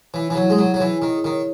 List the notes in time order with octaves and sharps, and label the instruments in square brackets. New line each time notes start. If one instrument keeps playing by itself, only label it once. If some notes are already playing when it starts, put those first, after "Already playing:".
[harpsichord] E3 [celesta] C#5
[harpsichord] E3 [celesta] E4
[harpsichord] F#3
[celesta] E4
[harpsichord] G#3
[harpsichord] F#3 [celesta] G#4
[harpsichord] F#3 [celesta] C#5
[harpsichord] E3
[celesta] E4
[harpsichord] D#3 [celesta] E4
[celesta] G#4
[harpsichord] D#3
[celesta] C#5